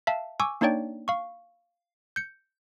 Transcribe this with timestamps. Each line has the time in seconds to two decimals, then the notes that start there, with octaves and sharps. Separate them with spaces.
0.07 E5 F5 A5
0.40 G#5 C#6 D6 E6
0.61 A#3 D4 D#4 C#5 D5 G5
1.08 F5 C#6
2.16 G6 C#7